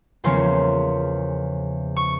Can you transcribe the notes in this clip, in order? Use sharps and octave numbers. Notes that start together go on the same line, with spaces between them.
E2 C#3 F3 A#3 C#4 C6
C#6